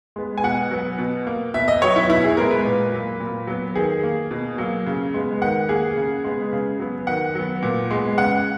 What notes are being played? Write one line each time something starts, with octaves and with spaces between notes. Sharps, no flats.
G#3 B3
G#5
B2 F#5
F#3 B3
B2
A#3
B2 E5
D#5
F#3 B3 C#5
E4
B2 E4
G#4
G#3 B3 A#4
B4
A#2
F#3 A#3
A#2
F#3 B3
D#3 G#4
A#3
B2
F#3 A#3
C#3
G#3 B3
D#3 F#5
A#3 G#4
C#3
G#3 B3
C#3
F#3 B3
D#3 F#5
F#3 B3
A#2
G#3 B3
C#3 F#5